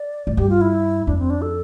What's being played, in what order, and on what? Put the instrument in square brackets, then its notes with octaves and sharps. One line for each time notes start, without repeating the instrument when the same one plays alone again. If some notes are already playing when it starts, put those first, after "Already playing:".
Already playing: [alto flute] D5
[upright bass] A2
[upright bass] G2 [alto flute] G4
[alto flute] F4
E4
[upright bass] F2 [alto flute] D4
[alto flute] C4
D4
A4